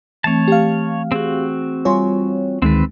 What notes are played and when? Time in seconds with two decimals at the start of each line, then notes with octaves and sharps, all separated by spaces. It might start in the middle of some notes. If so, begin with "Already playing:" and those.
0.24 E3 A3 C4 C#5 A5
0.48 A3 G4 F5
1.12 C4 F#4 G#4
1.85 G3 F4 C#5 G#5 C6
2.62 D2 D#3 G#3 C4 B4